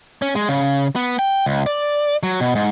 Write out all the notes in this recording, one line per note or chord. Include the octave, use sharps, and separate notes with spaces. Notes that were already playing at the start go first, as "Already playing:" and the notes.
C#4
G#3
C#3
B3
G5
C#2
D5
F#3
B2
G#2